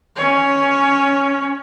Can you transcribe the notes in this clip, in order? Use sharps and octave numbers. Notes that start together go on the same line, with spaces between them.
C#4 C#5